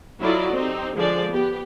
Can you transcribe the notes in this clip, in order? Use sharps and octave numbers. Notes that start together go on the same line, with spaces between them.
F#3 E4 F4 A4 D5 D#5
C4 D#4 G4
D3 F3 G#3 G#4 D5
B3 G4